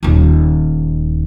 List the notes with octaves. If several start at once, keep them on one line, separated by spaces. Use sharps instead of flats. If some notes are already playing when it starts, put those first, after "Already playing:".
D#1 D#3